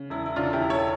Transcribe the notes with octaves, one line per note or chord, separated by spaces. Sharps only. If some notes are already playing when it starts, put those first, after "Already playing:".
Already playing: C#3
E1 E4
E4
C#3 D4 F4
A4
E4 G4
E1
A4 C#5